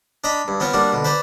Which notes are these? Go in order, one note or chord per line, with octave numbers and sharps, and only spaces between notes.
D4 D#5 A#5 B5
G2
B3 C4 F4 C#5
G3 A#3 D4 F#4
B2 D3
B4 C5 D5 A#5